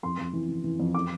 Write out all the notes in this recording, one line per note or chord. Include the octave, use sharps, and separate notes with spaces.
F2 C6
F2
E3
E3
E3
F2
D6